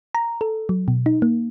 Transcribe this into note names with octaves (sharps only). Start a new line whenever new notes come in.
A#5
A4
F#3
B2
D#4
A#3